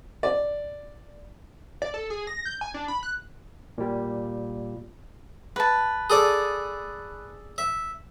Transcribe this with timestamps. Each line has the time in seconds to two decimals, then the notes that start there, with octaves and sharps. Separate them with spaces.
0.23 D5
1.82 D5
1.94 A4
2.10 G#4
2.27 A#6
2.45 G6
2.61 G#5
2.74 D4
2.88 B5
3.03 F#6
3.78 A#2 G3
5.56 B4 A5
6.10 G#4 A4 D5
7.58 E5